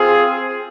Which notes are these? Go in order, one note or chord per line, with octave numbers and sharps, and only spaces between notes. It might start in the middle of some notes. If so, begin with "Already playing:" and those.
Already playing: E3 C4 F4 G#4